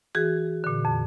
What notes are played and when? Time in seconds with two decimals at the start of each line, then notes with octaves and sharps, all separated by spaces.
0.15 E3 F#4 G#4
0.64 A#2 D3
0.85 F2